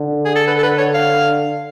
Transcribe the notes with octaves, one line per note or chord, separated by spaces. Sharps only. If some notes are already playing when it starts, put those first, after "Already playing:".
Already playing: D3
G#4
A4
B4
A4
B4
C#5
F5